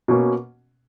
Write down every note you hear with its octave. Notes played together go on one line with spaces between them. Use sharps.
B2 A#3 C#4